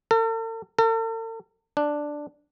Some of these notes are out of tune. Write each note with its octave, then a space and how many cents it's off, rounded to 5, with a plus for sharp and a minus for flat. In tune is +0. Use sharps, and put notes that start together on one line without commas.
A4 +45
A4 +45
D4 +5